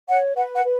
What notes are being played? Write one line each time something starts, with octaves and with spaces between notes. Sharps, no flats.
C#5 F#5
B4 F#5
F#5
B4